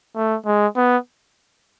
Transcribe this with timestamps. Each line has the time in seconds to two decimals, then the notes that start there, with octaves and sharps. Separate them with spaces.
0.15 A3
0.46 G#3
0.76 B3